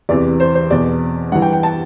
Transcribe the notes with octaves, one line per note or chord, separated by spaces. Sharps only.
E2 C3 E3 D5
C5
C5
E2 B2 D5
G2 E3 F#5
G5
G5
A5